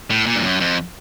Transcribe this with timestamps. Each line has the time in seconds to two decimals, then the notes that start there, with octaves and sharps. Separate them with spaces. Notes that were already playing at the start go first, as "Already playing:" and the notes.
0.10 A2
0.26 A#2
0.36 G2
0.43 F#2
0.60 F2